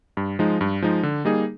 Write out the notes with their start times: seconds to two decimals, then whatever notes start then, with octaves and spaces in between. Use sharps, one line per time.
0.17 G2
0.39 F3 G#3 D#4
0.61 G2
0.82 F3 G#3 D#4
1.03 D3
1.25 G3 A#3 D#4 G#4